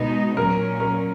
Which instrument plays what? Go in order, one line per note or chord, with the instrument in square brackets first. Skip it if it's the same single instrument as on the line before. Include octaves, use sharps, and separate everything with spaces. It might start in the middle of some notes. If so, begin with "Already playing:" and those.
Already playing: [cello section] B2 G#3 B3 D#4
[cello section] A#2 F#3 C#4 [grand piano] A#4
[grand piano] A#4